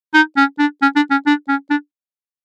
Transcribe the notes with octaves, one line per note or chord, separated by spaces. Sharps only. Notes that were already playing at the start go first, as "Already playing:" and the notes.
D#4
C#4
D4
C#4
D4
C#4
D4
C#4
D4